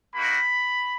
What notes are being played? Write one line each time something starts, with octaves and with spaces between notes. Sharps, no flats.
A#3 D#4 F#4 B5